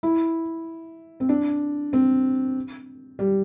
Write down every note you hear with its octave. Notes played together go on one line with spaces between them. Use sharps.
E4
C4
D4
C4
G3